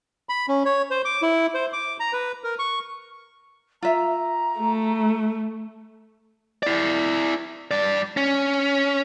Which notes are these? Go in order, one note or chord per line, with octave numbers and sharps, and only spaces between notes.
B5
C#4
C#5
C5
D6
E4
C5
D6
A#5
B4
A#4
C#6
F4 E5 A#5
A3
E4 D5
G2 D5
C#4